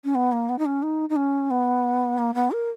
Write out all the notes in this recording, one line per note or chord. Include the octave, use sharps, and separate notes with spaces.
C#4
B3
A#3
B3
D#4
C#4
D#4
D#4
C#4
B3
A#3
B3
A#4